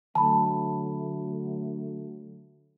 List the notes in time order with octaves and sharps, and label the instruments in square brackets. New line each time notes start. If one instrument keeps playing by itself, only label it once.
[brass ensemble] D3 F#3 A3 [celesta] A5 B5